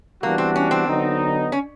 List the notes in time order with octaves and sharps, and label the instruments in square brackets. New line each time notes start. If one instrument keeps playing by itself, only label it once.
[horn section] E3 G3 B3 D4 F#4 [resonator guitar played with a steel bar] A#3
[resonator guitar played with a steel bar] C4
C#4
C4
[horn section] D3 F#3 B3 D#4
[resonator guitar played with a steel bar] C#4